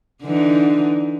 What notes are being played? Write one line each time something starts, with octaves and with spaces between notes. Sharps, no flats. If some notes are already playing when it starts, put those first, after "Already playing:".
D3 E3 D#4